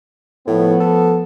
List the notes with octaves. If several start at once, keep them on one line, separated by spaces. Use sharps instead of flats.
A2 F3 A3 B3
A4